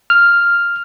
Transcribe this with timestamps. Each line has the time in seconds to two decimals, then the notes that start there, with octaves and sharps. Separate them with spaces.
0.10 F6